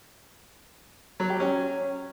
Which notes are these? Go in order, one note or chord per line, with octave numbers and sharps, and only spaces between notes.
F#3
G4
C#4